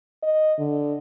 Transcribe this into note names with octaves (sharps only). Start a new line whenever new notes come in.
D#5
D3